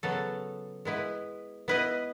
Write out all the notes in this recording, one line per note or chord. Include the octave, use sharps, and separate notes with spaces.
C#3 F#3 B3 F#4 A4
G#3 B3 E4 B4
B3 E4 B4 D#5